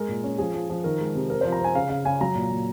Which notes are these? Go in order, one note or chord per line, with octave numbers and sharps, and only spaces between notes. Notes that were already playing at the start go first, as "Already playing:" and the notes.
Already playing: G#3 A#4
A#2
C#4
F3 G#4
F3
F3
D#3 A#4
G#3
C3
C4 A#4
C5
F3
A#5
C4 G#5
C#3 F5
C#3 F5
C#3 G#5
F#3 A#5
A#2
A#2